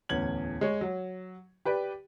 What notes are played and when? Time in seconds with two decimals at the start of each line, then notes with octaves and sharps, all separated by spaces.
0.09 D1 E2 C#4 G#6 F#7
0.61 G#3 C#5
0.81 F#3
1.65 G4 B4 D5 G5